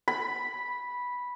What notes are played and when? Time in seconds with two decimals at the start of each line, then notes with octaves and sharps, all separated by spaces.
0.08 B5